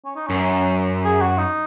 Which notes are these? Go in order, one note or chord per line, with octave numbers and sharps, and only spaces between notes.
C#4
D#4
F#2 C#4
G#4
F#4
D#4